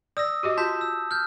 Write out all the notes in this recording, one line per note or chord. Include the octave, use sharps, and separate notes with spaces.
D5 D#6 E6 A#6
F#4 G4 D#5
F4 A5 G6 B6
E6
F6 G6